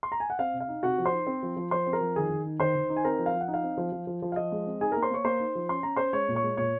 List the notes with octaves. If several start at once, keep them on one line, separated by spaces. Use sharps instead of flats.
C6
A#5
G#5
F#5
C4 F5
C3
F5
D#4
C3 F#4 F#5
F3
C5 C6
D#4
C4
F3
F3
F3 C5 C6
C4
A#4 A#5
F3
D#3 G#4 G#5
D#3
D#4
D#3 C5 C6
D#3
D#4
G#5
C4 A#4 A#5
F3
F5
F3
F#5
D#4
F5
C4
F3
F3
F3
F3
F5
F3 D#5
G#3
C4
D#4 G#4 G#5
A#3 A#4 A#5
C5 C6
A#3 C#5 C#6
A#3 C5 C6
D#4
F3
C#4 C6
C#4 A#5
C#4 C5 C6
G#3 C#5 C#6
A#2
C#5 C#6
G#3
A#2 C#5 C#6